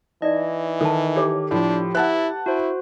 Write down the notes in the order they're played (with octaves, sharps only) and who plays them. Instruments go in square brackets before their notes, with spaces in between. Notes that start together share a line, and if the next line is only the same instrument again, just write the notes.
[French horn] E3 [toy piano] D#4 D5 [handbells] D#5
[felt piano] D#3 [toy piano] A4 A5
[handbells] G4 [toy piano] A4 C#5 D6
[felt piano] A2 F3 [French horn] D4
[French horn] E4 [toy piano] B4 [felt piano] F#5 A5 F#6
[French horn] E4 [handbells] F#4 C5